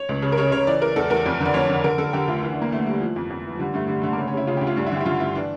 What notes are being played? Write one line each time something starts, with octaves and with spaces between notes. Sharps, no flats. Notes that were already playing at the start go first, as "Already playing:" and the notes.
Already playing: C#5
C#2
C#3
A#4
C#3 C#5
C#3 C#5
E3 D5
E3 A#4
E2 A4
E2 A#4
F2
D3 D5
F2 C#5
D3
D3 A#4
D3 A4
D3 G4
D2 F4
E3
D4
E3 A#3
E3 A3
E3 G3
E3 F3
F2
F2
E3
F3
D3 G3
G2 A3
D3 G3
D3 A3
A#3
C#3 A3
C#4
C#3 E4
C#3 F4
G4
D2
F4
G2 D4
E4
D3 G4
E4
D3 F4
G2 E4
E3 D4